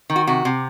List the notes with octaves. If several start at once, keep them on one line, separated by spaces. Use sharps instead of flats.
D#3
F#4
C3 F#4
C3